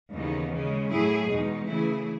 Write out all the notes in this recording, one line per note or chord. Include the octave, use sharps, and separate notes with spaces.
D#2 C#3 E3 B3 D#4
C#3 G#3 C#4
A2 F#3 A3 E4 G#4
E2 B2 G#3 D#4
C#3 E3 A3 E4 G#4